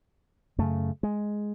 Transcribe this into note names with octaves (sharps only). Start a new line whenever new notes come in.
F#2 C#3 A3
G#3